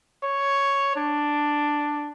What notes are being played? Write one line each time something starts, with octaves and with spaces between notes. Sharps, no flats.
C#5
D4